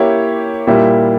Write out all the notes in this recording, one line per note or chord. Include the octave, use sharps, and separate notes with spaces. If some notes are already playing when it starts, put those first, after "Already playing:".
Already playing: A#3 E4 G4 C#5
A#2 G3 A#3 E4